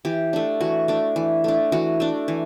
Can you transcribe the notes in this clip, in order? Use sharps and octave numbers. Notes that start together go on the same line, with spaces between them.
E3 G4
A3 D4
E3 F#4
A3 D4
E3
A3 D4
E3 F#4
A3 D4
E3